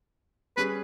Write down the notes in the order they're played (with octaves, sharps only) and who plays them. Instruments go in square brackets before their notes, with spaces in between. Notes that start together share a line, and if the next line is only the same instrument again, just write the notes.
[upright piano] G3 C#4 G#4 [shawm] B4